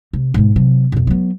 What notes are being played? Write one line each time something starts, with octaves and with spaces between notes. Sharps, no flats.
C3
G#2 B2
C3 F#3
F2 B2
F#3 B3